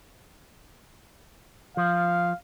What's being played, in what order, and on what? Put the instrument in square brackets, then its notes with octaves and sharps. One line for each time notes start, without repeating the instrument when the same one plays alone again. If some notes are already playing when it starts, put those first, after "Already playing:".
[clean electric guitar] F3 [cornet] F5